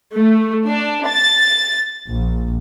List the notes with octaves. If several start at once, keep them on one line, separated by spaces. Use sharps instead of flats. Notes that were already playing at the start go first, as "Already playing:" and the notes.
A3
D4
A6
A#1